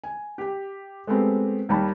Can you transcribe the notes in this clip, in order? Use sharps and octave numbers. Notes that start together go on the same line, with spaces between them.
G#5
G4 G5
G#3 A3 B3 C4 G4
D#2 G3 A5 B5